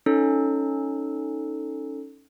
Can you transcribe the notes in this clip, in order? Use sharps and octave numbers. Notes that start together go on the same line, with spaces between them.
C#4 D#4 A4